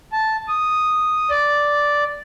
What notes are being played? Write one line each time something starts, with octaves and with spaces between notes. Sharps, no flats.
A5
D#6
D5